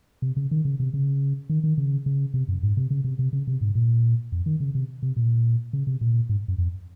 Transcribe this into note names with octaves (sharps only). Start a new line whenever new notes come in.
C3
C#3
D#3
C#3
C3
C#3
D#3
D#3
C#3
C#3
C3
F#2
G#2
C3
C#3
C3
C3
C#3
C3
G#2
A#2
F2
D#3
C#3
C3
C3
A#2
C#3
C3
A#2
G#2
F#2
F2